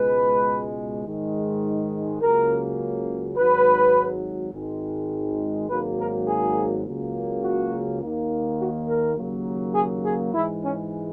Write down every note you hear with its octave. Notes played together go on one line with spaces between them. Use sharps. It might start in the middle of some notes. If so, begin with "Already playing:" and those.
Already playing: C#2 B2 G#3 B4
G#2 D#3 G#3
C#2 C#3 F#3 A#3 A#4
G#1 G#2 F#3 B4
G#1 G#2 D#3 G#3
G#1 G#2 F#3 A#3 B4
A#4
G#4
C#2 C#3 F#3 A#3
F#4
D#2 D#3 A#3
F#4
A#4
D#2 C#3 F#3 A#3
G#4
G#4
G#2 E3 G#3 E4
C#4